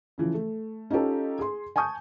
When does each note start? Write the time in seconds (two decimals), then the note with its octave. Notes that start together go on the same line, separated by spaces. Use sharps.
0.18 C#3 E3 F3
0.34 A3
0.90 C#4 D#4 F4 G4 A4
1.39 G#4 C6
1.76 G#5 A5 C#6 D#6 G6